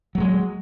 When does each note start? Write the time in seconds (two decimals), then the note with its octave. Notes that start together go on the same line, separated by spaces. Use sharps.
0.15 F#3
0.18 A3
0.20 G#3